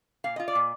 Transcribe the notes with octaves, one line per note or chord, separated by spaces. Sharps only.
A#2 F5
F4 D#5
D5
A#2